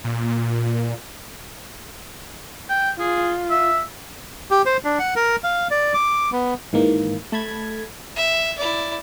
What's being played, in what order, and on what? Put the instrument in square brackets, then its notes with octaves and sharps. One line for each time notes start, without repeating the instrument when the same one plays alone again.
[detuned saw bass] A#2
[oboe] G5
[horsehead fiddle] F4 [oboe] G#4
[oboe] E5
[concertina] G4
C5
D4
F#5
A#4
F5
D5
D6
B3
[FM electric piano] G#2 D#3 E3 A#3
A3 A5 B5 G#6
[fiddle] E5
E4 D5